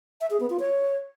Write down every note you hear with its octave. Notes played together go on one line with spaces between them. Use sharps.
E5
G#4
B3
F4
C#5